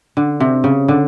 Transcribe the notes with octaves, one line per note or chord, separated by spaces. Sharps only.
D3
C3
C#3
D3